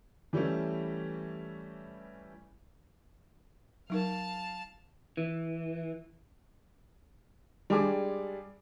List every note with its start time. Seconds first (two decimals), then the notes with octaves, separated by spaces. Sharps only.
0.33 E3 G3 A3 C#4 E4
3.90 F#3 D#4 A#4 F5 A5
5.17 E3
7.70 G3 G#3 D4 G#5 D6